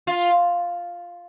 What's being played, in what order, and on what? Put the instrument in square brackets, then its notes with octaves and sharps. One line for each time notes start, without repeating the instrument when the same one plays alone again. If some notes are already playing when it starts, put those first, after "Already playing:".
[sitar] F4